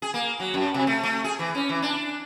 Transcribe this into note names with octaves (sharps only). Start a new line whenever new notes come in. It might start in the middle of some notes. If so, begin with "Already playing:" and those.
G#4
A#3
F#3
F#2
C3
A3
A3
G#4
E3
C#4
E3
D4